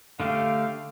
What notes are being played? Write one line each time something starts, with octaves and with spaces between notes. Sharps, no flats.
D3 A3 G4 F5